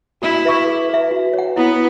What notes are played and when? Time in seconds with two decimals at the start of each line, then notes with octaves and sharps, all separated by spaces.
0.22 E4 F#4
0.45 B4 E5 C#6
0.67 G#4
0.89 B4 E5
1.11 F#4
1.33 C#5 F#5
1.56 B3 E4